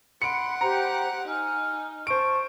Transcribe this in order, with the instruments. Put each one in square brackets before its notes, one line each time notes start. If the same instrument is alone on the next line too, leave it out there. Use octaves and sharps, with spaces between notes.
[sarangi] F#5 [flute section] B5 C6 [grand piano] C#7 D7
[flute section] G4 C5 G5 [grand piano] A#5
[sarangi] D#4 [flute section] G#5 F6
[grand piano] C5 D7 [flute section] A5 C#6